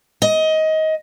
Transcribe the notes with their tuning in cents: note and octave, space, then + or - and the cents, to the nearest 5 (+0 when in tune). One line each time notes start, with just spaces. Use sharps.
D#5 +20